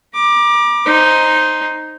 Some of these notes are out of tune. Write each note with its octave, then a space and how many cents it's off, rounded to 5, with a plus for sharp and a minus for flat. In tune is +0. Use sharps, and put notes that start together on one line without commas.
A#5 +45 D6 +15
D#4 +0 C5 +5